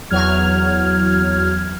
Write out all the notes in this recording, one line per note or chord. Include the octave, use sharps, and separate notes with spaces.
E2 F#3 F6 G#6